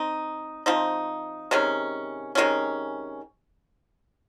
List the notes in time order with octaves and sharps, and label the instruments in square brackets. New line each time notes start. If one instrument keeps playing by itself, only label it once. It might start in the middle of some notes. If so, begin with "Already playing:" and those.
Already playing: [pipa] C4 D#4
F3 C4 D#4
C3 D#3 G#3 C#4
C3 D#3 G#3 C#4